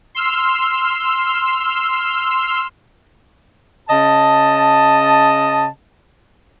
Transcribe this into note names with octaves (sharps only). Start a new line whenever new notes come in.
C6 E6 F6
C#3 D#5 A5